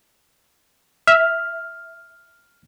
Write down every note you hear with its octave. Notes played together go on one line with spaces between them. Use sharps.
E5 F6